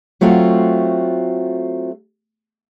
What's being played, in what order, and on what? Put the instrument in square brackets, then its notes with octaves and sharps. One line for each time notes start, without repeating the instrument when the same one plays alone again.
[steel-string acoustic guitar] F#3 A3 C4 F4 F#4